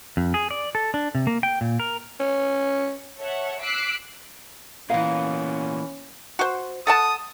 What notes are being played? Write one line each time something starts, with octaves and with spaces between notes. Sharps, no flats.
F2
G#4
D5
A4
D4
C3
A#3
G5
A#2
A#4
C#4
A4 C#5 E5 F#5
D6 E6 F#6 B6 C7 D7
A#2 E3 B3 C#4 A#4 F5
F#4 C5
A4 F#5 A5 D#6